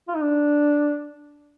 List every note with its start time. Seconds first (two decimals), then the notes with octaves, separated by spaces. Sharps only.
0.08 F4
0.15 D#4
0.22 D4